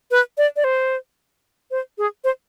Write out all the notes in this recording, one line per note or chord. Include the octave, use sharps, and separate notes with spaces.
B4
D5
D5
C5
C5
G#4
C5